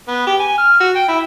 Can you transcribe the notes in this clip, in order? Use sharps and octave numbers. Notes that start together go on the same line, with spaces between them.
B3
G4
G#5
F6
F#4
G5
E4